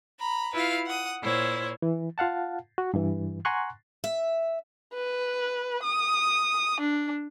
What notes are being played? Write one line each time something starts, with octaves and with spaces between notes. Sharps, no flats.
A#5 B5
E4 F4 B4 F5
F#5 D#6
A#2 E4 C5 C#5
E3
F4 F5 F#5 A5
F#4
G2 E3
F#5 G#5 A#5 C6 C#6 F#6
E5
B4
D#6
D4